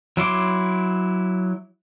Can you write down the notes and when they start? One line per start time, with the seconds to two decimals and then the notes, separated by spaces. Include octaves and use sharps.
0.17 F#3 E4 C6 D6